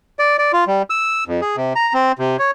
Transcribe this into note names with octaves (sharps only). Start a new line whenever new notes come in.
D5
D5
F4
G3
E6
F2
G#4
C3
A#5
C4
C3
C#5